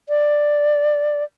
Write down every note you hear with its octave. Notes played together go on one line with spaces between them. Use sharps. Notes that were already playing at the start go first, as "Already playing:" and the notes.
D5